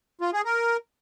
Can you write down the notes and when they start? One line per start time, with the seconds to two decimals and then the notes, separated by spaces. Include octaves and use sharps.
0.21 F4
0.33 G#4
0.45 A#4